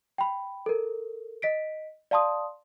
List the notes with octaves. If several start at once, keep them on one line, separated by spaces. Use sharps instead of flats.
G5 B5
A4 A#4
D#5 B6 D7
D5 F5 A5 C6 D#6